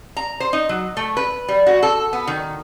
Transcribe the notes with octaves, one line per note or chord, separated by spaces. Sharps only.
A#5
C5
D#4
F#3
A3
B4
G3
F#4
A4
B3
D#3